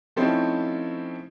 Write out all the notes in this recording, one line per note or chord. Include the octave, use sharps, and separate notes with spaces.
F3 A3 C4 C#4 D#4 E4